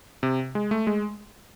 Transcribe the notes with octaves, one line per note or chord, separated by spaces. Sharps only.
C3
G#3
A3
G#3